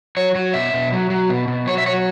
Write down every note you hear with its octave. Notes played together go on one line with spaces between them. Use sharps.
F#3 C#5
F#3
B2 E5
B2
F#3
F#3
B2
B2
F#3 C#5
E5
F#3 C#5